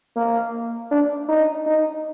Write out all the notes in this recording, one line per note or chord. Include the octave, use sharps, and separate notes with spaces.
A#3
D4
D#4
D#4